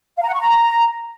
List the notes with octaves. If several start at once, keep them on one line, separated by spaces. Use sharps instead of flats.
F5
A#5
F#5
C#6
A#5